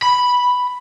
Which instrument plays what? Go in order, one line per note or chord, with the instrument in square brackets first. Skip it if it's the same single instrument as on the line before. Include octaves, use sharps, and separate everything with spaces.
[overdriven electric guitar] B5